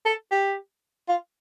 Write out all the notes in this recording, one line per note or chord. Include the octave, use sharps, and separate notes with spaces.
A4
G4
F4